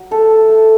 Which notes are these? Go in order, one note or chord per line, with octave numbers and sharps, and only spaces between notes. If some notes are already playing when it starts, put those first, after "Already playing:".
Already playing: F#3
A3 A4
A3